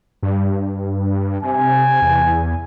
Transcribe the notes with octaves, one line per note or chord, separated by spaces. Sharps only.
G2
C3 G#5
E2